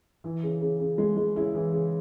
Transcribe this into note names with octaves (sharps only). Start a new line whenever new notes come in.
E3
C#3
C#3
C#3
G#3
G#3
C#3 E4
E3
C#3